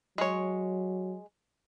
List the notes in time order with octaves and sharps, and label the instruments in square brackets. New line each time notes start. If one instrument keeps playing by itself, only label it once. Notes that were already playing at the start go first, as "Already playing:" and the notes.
[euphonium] F#3 [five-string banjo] G#3 C#5